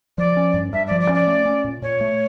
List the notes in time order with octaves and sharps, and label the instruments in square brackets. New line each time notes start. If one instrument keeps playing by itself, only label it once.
[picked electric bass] F3 [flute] D5
[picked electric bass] C#4
G2
[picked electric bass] G2 [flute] E5
[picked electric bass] F3 [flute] D5
[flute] D5
[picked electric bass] C#4
[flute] D5
[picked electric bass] A3
C#4
A#2
[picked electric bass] A#2 [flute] C#5
[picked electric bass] A3